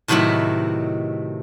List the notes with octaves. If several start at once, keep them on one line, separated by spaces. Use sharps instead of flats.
A2 C3 D#3 F#3 B3 E4